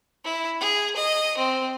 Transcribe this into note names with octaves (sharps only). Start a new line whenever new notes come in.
E4
G#4
D#5
C4